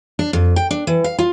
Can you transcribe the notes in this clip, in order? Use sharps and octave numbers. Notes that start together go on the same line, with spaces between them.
D4
F2
G5
D4
E3
F5
F4